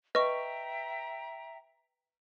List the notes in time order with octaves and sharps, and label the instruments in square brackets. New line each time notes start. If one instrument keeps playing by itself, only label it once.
[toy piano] B4 [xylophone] D#5 C#6 [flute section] E5 G5 A#5